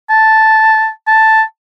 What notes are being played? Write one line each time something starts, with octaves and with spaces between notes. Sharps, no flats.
A5
A5